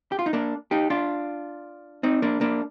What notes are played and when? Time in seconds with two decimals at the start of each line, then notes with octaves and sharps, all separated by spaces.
0.12 G4
0.19 F4
0.26 D#4
0.33 A#3 D4
0.71 D#4 G4
0.90 D4 F4
2.03 C4 D#4
2.22 A#3 D4
2.41 A#3 D4